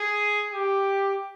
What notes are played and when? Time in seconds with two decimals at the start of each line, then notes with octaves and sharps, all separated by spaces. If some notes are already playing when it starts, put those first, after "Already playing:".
Already playing: G#4
0.51 G4